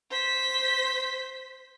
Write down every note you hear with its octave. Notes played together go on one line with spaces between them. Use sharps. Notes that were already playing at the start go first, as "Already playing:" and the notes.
C5 B6